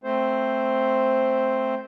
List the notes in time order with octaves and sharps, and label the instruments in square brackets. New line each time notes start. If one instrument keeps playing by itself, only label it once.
[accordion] A3 C4 C5